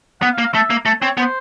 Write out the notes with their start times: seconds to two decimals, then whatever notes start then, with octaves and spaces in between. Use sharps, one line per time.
0.22 B3 F#5
0.33 F5
0.38 A#3
0.44 F5
0.53 A3 E5
0.70 A#3
0.86 A3
1.01 C4 C#5
1.17 B3 C5